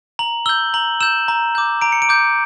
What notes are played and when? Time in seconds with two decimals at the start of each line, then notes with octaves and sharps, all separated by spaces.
0.19 A#5 F#7
0.46 E6 G6 G7
0.74 A#5 F#7
1.01 E6 G6 E7
1.28 A#5
1.55 D6 G6
1.81 A#5 D7
1.92 C#7
2.02 D7
2.09 D6 G6